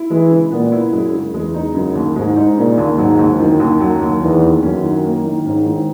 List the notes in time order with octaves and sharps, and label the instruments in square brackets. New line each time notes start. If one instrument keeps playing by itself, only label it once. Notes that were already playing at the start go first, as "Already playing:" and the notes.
Already playing: [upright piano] E4
[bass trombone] E3 [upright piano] G#3
[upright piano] C#3
[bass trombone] A#2 [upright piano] B3
[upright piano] E4
[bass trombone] F#2 [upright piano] G#3
[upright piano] C#3
[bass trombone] E2 [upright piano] G#3
[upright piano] D#4
[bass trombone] F#2 [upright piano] C#3
[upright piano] D#2
[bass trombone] G#2 [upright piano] G#3
[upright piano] D#4
[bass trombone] A#2 [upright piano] C#3
[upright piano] D#2
[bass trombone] G#2 [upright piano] F#3
[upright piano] D#2
[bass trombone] F#2 [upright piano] D#3
[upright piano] D#2
[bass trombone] F#2 [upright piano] F#3
[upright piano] D#2
[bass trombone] E2 [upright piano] D#3
[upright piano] D#2
[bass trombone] F#2 [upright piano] C#4
[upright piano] D#3
A#3
D#3
[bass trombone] G#2 [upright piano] C#4
[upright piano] D#3